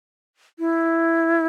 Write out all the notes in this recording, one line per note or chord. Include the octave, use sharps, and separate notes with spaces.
E4